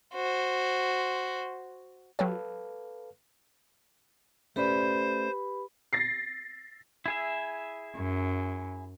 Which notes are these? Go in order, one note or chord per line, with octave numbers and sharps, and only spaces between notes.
F#4 C5
F#3 G4 A4 B4 C#5 F5
A3 C#4 G4 B4 C5 D5 B5
A6 A#6 C7
E4 G#4 E5
F#2